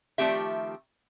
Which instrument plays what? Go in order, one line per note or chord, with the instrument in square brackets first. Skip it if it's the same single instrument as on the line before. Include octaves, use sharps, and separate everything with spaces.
[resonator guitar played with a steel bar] D#3 F3 A3 C4 G4 E5